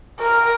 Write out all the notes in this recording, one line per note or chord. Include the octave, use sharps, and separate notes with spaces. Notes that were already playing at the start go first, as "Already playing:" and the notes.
A#4